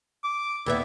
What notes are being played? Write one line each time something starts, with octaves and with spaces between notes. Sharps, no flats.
D6
D#2 B3 E4 E5